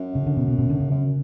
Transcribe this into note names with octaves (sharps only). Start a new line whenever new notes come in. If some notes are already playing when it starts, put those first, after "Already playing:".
Already playing: F#2
C#3
D3
B2
B2
B2
D3
C#3
F#2